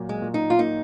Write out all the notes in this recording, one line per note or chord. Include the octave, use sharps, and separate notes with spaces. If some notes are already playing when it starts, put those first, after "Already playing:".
Already playing: A#2 F#3 A#3
G#3
A#2
D#4
F4
A#3 D#4